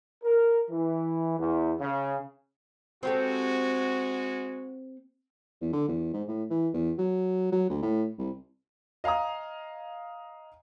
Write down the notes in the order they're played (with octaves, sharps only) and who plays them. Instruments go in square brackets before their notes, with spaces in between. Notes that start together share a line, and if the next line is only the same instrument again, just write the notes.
[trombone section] A#4
E3
E2
C#3
[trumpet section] G#3 F#4 [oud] C4 G4 A4
[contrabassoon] E2
D3
E2
G#2
A2
E3
E2
F#3
F#3
D2
A2
C2
[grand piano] D#5 F5 G#5 A#5 D#6